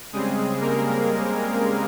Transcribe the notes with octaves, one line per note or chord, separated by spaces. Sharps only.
C#3 G3 G#3 C4 G#4
A#3 A#4